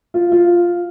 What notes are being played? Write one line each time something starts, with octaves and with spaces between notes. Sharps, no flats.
F4
F4